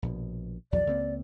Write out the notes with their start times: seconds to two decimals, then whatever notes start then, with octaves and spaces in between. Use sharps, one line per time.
0.02 A#1 B2
0.72 A#1 E2 F#3 D5
0.87 C#2 A#3 C4